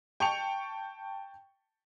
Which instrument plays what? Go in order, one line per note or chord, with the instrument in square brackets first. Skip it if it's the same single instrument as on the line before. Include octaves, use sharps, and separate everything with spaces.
[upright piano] G5 A5 C#6 C#7 F7